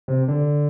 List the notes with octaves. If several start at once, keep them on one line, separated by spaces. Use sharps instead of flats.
C3
D3